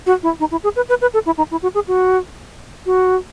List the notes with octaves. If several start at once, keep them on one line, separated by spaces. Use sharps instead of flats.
F#4
E4
D#4
E4
G#4
B4
B4
B4
A4
E4
D#4
E4
F#4
G#4
F#4
F#4